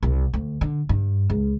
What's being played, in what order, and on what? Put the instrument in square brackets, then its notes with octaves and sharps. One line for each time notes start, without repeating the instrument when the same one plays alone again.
[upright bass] C2
D2
D3
G2
C#2